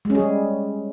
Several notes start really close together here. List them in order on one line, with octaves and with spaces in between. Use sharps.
G#3 C#4 G#4 G3